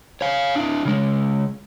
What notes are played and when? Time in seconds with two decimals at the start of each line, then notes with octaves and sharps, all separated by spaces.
0.21 C#5 F5
0.56 D4 E4
0.85 C#3 G#3